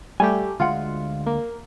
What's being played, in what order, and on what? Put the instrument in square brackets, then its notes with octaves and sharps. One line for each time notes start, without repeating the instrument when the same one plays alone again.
[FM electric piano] G3 A3 G4 [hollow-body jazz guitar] G#5
[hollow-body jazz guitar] D2 G#3 F#5 [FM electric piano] F4
[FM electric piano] A#3